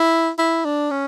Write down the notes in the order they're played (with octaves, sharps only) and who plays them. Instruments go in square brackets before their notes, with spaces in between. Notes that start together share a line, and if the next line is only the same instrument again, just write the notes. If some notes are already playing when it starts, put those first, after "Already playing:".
Already playing: [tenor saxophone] E4
E4
D4
C#4